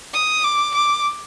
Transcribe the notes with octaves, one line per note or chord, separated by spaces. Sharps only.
D#6
D6
D6